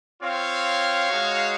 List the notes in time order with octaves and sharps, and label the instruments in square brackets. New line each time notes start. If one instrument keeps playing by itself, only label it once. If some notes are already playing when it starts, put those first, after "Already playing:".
[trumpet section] C4 F4 C#5 F5
G#3 D#4 F#4